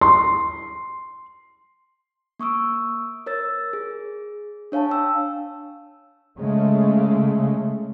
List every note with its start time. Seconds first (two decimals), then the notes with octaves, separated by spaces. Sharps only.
0.01 C6
2.39 A#3 C#6 D#6 E6 D7
3.26 A#4 C#5 E6 A6
3.73 G#4
4.72 D4 C#5 F5 G#5 A5
4.89 G5 E6
6.39 C#3 G#3 A3